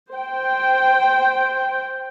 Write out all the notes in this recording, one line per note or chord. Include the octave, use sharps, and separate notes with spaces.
C5 G5